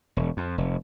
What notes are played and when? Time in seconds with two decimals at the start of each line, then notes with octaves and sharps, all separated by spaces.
0.17 E1
0.37 F2
0.58 F1